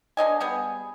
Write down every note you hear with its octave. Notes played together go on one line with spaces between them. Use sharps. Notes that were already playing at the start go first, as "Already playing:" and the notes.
D3 C5 D#5 G#5
G3 B3 G#4